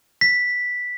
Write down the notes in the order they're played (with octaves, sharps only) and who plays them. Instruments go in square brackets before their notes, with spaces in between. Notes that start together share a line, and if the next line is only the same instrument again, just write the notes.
[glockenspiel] B6